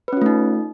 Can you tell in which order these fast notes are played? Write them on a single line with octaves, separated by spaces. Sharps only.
B4 C#4 F4 A3 D#4